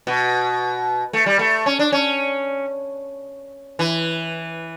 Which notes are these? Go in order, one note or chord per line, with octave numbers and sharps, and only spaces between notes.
B2
A3
G3
A3
C#4
D4
C#4
E3